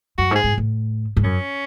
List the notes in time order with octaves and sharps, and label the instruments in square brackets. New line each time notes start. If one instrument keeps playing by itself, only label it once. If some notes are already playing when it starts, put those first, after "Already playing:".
[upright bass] F#2 [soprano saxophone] F#4
[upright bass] G#2
[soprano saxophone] G#4
[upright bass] G#2
A2
G#2
[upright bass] F#2 [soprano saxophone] C#4